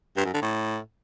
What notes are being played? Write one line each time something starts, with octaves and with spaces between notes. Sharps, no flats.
G2
F#2
D3
A2